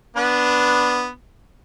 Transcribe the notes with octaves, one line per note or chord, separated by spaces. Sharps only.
B3 D4 B4